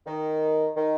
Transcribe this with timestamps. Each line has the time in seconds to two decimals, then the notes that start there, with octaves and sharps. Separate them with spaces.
0.06 D#3
0.76 D#3